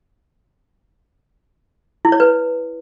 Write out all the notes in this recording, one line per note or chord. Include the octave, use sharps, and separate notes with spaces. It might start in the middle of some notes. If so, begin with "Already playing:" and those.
E4
C#5
B4